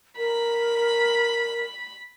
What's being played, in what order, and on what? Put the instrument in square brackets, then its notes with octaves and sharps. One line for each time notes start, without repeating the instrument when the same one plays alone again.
[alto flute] A#4 [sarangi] B5